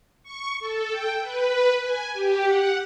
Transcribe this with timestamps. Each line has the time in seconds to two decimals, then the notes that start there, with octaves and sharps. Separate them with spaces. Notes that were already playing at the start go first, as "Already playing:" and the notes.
0.23 C#6
0.59 A4
0.90 G5
1.20 B4
1.81 G#5
2.13 G4
2.44 F#5